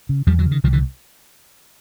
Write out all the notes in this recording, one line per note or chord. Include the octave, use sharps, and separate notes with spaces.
C#3
E2 F3 G3
E3 F#3
C#3
D#3
C2 D#3 F3
D3 E3